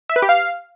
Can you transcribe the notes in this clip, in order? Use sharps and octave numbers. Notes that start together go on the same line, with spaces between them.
E5
B4
G4
F5